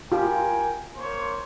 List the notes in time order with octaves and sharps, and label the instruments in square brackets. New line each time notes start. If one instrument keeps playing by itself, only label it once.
[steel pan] F4 G4 [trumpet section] A#4 G5 G#5
[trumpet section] A#3 C5 C#5